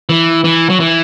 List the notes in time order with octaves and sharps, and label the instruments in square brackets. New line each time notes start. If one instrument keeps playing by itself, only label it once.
[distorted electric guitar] E3
E3
F#3
E3